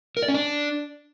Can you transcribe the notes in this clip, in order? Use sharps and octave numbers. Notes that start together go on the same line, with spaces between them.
A#4
D5
C#4
D4